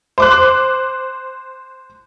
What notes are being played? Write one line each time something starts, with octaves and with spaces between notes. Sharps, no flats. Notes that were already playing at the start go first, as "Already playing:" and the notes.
C5 D6 F#6